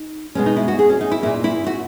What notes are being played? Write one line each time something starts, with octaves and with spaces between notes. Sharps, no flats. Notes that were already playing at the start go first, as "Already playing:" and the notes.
Already playing: D#4
B2 G#3 B3 C#4
D#4
E4
F#4
G#4
C#4
D#4
E4
A#2 A#3 E4
E4
F#4